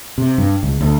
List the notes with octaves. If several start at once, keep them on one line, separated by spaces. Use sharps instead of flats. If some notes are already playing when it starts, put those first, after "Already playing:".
C3
G2
C#2
D2